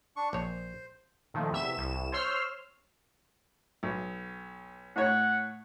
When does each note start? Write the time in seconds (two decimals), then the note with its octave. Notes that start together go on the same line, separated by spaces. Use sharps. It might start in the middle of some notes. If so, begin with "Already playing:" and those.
0.17 D4 C#6
0.33 A#1 C5 C#5
1.34 A#2 D#3 F3 A3
1.51 E2 C3 E5 E7
1.74 C2 E7
2.12 C5 C#5 C6 E6 F6
3.83 B1
4.96 A2 C#5 F#5